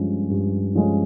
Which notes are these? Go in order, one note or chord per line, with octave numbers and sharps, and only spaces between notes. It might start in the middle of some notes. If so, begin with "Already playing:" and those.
Already playing: G2 F3 G#3 C#4
G2
F3 G#3 C#4